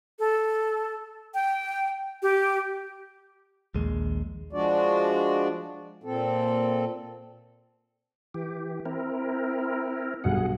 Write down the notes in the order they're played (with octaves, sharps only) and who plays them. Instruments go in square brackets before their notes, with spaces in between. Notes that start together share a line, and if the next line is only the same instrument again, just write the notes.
[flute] A4
G5
G4
[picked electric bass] A#1 D#2 G#3
[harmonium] F3 G#3 D4 F#4 D5
A#2 C4 A4
[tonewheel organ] E3 G4
C4 E4 A#4
[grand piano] B1 G2 F#4 [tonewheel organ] G#4 F#5